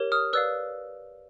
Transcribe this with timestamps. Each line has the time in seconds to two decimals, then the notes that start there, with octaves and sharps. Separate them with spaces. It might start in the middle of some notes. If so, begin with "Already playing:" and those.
Already playing: G4 A#4 C#5
0.12 D#6 F6
0.33 B4 D5 F5 E6 F#6